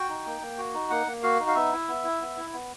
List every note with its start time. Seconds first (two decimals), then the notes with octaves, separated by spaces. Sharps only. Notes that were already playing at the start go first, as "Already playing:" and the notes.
Already playing: F#4 G5
0.09 D#4
0.26 A#3
0.41 A#3
0.58 F#4
0.74 D#4
0.90 A#3 F#5
1.07 A#3
1.23 F#4 F5
1.40 D#4
1.47 F5
1.55 B3 E5
1.72 E4
1.88 B3
2.04 E4
2.21 B3
2.37 E4
2.53 B3